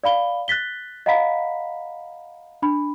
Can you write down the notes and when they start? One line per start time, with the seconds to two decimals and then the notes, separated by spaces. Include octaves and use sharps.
0.04 D5 F5 B5 G7
0.48 F#6 A6 B6 G7
1.06 D#5 F5 F#5 A#5 B5 B6
2.62 D4 B5